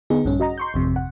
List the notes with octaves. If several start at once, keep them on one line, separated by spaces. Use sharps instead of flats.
D3 B3 D#4 G#4
A#1 G2 C#4
F#4 D#5 A#5
C6 C#6 G6
G#1 F2 C3
F#5